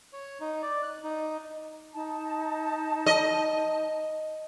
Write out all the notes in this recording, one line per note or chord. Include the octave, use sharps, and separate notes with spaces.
C#5
D#4
D5
F#6
D#4
D#4 A5
D#5